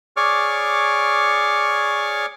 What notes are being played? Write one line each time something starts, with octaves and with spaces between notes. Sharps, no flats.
G#4 C#5 D5 C#6 D6 F6